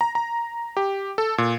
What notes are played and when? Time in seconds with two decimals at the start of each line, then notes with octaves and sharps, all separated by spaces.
0.01 A#5
0.15 A#5
0.77 G4
1.18 A4
1.38 A#2